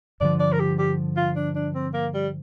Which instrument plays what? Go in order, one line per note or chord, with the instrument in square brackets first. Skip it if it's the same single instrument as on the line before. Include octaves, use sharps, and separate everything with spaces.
[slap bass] G2 D3 F3 [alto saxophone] D5
[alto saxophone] D5
A#4
G4
G4
F4
D4
D4
C4
A#3
G3